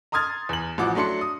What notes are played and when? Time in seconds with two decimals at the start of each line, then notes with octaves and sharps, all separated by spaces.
0.12 A#5 C6 D#6 F6 G#6 A6
0.49 E2 F#7
0.78 A1 F3 F#4 D6
0.95 F#3 A3 D4 C6 C#7
1.21 D#6